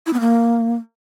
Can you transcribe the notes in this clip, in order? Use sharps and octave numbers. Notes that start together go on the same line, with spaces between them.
E4
B3
A#3